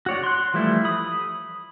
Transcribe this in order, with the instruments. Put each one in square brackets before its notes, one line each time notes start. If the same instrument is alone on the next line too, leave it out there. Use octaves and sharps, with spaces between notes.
[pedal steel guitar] F#4 C#5 D5
C6 F#6
E3 F3 G3 A3 E4
B5 D#6